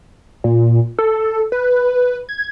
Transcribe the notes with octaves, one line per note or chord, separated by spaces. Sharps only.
A#2
A4
B4
G#6